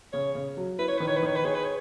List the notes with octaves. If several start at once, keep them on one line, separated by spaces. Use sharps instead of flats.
C#3 C#5
C#3
F#3
E4 B4
C#5
D#3 B4
C#5
B4
D#3 C#5
B4
G#4 C#5
B4
C#5